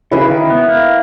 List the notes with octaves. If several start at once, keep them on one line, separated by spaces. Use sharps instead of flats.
C#3 E4 B4 E5
D#3
B3
A#3